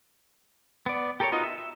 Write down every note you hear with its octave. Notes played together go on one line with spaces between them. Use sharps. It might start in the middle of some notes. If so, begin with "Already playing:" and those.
B3 D5
G4 A4 A#4 C5 C#5
B3 D#4 F4 F#4 D#5
E5
E5